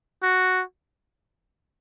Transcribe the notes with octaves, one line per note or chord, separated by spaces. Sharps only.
F#4